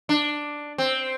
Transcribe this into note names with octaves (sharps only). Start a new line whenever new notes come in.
D4
C4